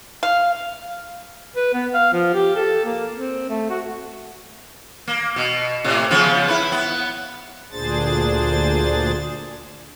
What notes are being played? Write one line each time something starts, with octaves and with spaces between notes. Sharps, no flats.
F5
B4
B3
F5
F3
G4
A4
A#3
C4
A3
F#4
A#3
B2
A2 C3
C#3 F3 B3
E4 B4
B3
D2 A#2 D4 G#4 C5 A6